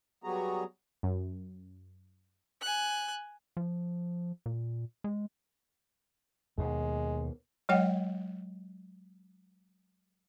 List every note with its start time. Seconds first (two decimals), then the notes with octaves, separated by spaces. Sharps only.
0.24 F#3 G3 B3 F#4 G#4 A#5
1.03 F#2
2.61 G#5 F#6
3.57 F3
4.46 A#2
5.04 G#3
6.58 D#2 B2 G#3
7.69 F#3 G#3 C#5 D#5 F#5 G5